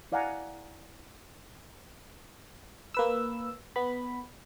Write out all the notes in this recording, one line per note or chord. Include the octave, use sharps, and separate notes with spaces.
E4 D5 F5 F#5 G#5 A#5
A#3 B4 E6
B3 B5